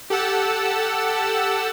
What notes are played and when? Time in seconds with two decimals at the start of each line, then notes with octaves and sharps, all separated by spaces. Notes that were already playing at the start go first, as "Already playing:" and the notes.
0.10 G4 A4 F#5 A5 E6